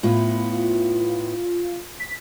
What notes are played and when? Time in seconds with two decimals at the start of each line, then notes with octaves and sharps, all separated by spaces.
0.03 A2 B3 F4
2.00 B6